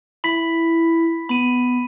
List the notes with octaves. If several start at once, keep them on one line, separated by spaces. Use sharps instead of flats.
E4 B5 B6
B3 B5 D#7